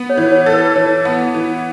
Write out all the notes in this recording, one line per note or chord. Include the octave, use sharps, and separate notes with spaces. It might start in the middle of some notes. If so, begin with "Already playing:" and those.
Already playing: B3
C#5
E3
C#5
A4
B4
E3 C#5
B3
E3